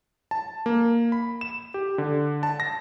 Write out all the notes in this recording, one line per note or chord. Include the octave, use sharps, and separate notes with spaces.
A5
A#3
B5
E7
G4
D3
A5
A#6